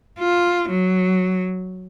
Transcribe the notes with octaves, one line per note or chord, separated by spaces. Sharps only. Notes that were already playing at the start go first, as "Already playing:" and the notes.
F4
F#3